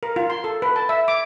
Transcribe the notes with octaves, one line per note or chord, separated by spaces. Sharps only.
A#4
F4
C6
A4
B4
A5
E5
D6